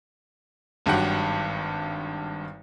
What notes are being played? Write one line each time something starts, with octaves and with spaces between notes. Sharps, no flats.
G#1 G2 F#3 G4 F#5